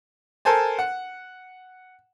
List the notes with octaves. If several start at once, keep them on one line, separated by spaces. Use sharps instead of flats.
A4 A#4 C5 G#5 A5
F#5